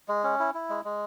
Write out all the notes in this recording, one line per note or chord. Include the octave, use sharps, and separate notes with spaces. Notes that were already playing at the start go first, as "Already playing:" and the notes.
G#3
C#4
E4
E4
G#3
G#3